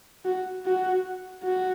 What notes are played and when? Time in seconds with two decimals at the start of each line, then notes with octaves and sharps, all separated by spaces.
0.25 F#4
0.65 F#4
1.44 F#4